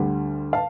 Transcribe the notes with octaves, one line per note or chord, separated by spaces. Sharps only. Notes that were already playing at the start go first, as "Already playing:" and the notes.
Already playing: D2 D3 G3
F5 A5